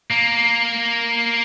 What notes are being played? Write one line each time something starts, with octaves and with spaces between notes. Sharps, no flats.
A#3